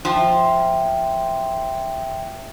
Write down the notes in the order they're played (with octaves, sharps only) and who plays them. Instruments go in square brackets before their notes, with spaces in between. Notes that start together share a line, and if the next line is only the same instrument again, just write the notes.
[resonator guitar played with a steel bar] F3 [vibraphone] E5 G5